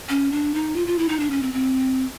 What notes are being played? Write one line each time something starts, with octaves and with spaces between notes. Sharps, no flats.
C#4
D4
D#4
F4
F4
E4
D#4
D4
C#4
C4
C4